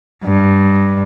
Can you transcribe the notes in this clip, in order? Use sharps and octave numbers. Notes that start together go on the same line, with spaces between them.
G2